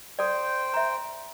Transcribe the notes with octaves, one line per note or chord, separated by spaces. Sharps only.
A4 C5 D5 G5
E5 A#5